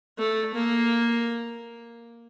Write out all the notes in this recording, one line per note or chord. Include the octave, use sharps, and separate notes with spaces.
A3
A#3